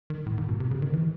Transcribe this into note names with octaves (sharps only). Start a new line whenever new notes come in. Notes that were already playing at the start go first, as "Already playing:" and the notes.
D#3
A2
G#2
B2
C3
C#3
D#3
E3